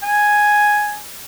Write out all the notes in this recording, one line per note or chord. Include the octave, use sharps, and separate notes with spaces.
G#5